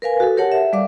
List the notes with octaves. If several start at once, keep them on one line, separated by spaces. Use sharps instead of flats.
A#4 B4 F5 G#5
F#4 A4
G4 A#4 C#5 F#5 A5
E5
G3 D5 F5 D6